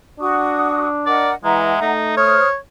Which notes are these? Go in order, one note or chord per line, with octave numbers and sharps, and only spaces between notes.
D4 F#4 C#6 D#6
A#4 D5 D#5 F#5
E3 G#3 E5 F#5 A#5
A3 D#4
C5 C#5 D#6 F6